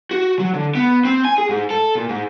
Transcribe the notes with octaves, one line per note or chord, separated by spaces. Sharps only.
F#4
F#3
D3
B3
C4
G#5
G#4
G#2
A4
A#2
G#2